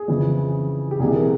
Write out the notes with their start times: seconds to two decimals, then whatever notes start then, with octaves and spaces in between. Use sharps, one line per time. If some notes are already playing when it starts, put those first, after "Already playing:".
Already playing: G#4
0.08 F2 C#3 E3
0.91 G4
1.00 C2 C3 E3 G#4
1.15 A#4